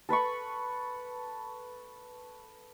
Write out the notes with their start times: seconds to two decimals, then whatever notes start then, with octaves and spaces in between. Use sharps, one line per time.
0.09 A4 B4 B5 C#6